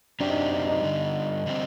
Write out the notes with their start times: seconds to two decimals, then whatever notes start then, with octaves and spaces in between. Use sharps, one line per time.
0.20 F#2 F#3 C4 D4 G4
0.29 D#4
0.36 D4
0.51 D#4
0.67 D#4
0.82 G2 D3 G3
1.46 D3 G3 C4